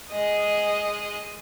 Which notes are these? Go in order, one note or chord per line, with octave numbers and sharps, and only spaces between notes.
G#3 D#5